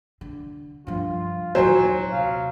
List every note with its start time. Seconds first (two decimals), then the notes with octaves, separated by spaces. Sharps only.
0.21 D3
0.87 G2 F3 F4
1.55 D#2 A#2 F#3 C5 G#5
2.12 C3 F5